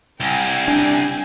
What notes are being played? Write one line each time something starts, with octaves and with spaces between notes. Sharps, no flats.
C2 G5 G#5
D4